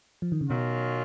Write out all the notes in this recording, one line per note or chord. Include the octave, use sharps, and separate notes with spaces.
F3
D#3
C#3
B2 D#3 F#3 C#4 F4